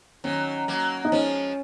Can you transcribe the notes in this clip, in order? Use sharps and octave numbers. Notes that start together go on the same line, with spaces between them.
D#3 F#3 C#4
F#3 A#3
D#4
F3 G#3 C#4